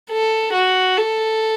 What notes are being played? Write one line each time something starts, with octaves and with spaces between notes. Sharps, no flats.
A4
F#4
A4